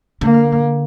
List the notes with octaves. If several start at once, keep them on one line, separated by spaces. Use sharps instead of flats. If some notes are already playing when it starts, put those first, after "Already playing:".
D3 A#3